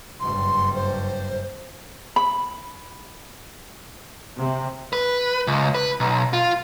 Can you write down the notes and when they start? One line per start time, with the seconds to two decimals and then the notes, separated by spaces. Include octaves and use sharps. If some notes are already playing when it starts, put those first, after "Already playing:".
0.20 F#1 G2 C6
0.75 C5
2.16 B5
4.37 C3
4.93 B4
5.47 C#2
5.75 B4
6.00 B1
6.33 F4